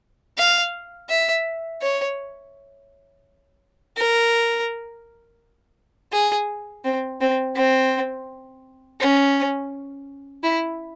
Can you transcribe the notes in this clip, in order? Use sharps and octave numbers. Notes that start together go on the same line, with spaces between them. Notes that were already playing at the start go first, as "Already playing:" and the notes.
F5
E5
C#5
A#4
G#4
C4
C4
C4
C#4
E4